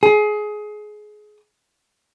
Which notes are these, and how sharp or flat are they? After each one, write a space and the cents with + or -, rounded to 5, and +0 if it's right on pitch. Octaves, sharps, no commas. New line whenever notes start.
G#4 +20